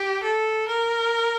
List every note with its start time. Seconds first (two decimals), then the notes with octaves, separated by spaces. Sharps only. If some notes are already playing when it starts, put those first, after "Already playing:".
Already playing: G4
0.23 A4
0.68 A#4